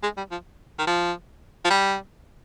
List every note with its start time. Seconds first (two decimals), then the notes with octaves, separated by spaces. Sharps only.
0.03 G#3
0.17 G3
0.31 F3
0.79 D#3
0.87 F3
1.65 F3
1.70 G3